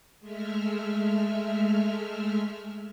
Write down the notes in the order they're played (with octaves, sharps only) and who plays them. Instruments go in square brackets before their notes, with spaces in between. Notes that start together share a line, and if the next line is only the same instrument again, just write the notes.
[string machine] G#3 A3 E5 F6